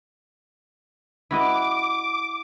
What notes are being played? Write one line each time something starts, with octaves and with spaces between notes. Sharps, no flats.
E4 F#4 D#5 D6